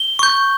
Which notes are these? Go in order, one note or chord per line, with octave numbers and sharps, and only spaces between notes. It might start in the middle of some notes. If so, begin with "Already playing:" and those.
Already playing: G7
C#6 G6